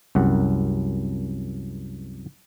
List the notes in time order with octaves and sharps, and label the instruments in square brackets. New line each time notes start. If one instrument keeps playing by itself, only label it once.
[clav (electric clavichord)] C2 F#2 F#5